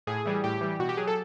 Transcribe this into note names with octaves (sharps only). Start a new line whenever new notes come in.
A2 G#4
E3 G3
A2 G4
E3 G3
B2 F#4
G4
F#3 G#4
A4